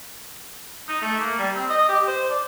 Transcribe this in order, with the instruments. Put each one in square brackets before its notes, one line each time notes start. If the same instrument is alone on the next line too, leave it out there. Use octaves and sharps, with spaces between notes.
[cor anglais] D#4
A3
A#3
G3
C4
D#5
G4
C5
D5